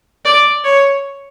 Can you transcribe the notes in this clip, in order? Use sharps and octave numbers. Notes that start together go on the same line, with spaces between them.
D5
C#5